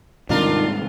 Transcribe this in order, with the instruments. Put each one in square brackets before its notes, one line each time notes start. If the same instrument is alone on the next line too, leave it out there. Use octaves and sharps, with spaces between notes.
[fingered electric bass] G#2 C3 G3 [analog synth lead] D#3 [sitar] D4 F4 A#4